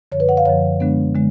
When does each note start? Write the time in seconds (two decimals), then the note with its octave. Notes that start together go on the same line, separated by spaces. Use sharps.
0.12 F#2 D3 F3 C#5
0.20 B4
0.29 F#5
0.37 F5
0.45 F#2 D3 F3 C#5
0.80 D3 G#3 B3 D4
1.15 D3 G#3